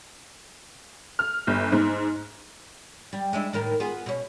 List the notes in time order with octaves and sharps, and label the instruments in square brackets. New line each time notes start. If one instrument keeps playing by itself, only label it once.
[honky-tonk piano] F6
G1
G#2
[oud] G3
G#3 D4 E4
A2 D#3 A#4
B3 F4 G#4
B2 C#4